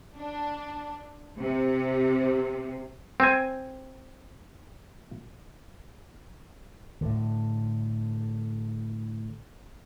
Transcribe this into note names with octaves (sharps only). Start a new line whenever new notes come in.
D4
C3
C4 G#5
A2 D3